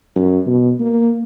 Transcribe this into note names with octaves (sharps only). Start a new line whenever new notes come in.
F#2
B2
A#3